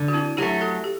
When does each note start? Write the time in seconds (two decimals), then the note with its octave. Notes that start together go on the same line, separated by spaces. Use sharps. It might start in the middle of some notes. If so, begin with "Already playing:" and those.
Already playing: D3
0.08 F#4
0.13 C4 E4
0.37 F#3 A3 E4 G4
0.61 F#4 A4
0.84 G4